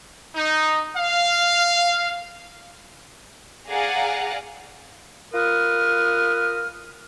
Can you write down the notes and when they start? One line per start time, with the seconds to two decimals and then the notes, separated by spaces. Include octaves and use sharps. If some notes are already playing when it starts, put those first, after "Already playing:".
0.35 D#4
0.96 F5
3.69 G#4 D5 F5 F#5 A#5
5.33 F4 A#4 B4 D#6 F6